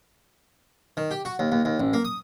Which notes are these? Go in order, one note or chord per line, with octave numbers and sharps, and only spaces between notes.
D#3
G4
F#4
D#2
D#2
D#2
A1
A#3
D#6